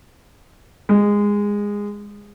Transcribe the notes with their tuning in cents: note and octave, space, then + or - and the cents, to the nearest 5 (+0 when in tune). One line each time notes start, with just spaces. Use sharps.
G#3 -15